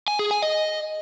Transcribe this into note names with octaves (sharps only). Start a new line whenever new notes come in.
G#5
G#4
G#5
D#5